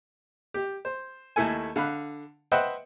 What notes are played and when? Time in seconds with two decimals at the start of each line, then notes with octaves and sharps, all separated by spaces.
0.54 G4
0.85 C5
1.36 D#2 A3 E4 A4 G#5
1.76 D3 F5 B5 F#6
2.52 B4 C5 D#5 E5 F#5 G5